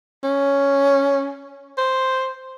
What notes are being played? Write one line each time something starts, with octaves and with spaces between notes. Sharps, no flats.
C#4
C5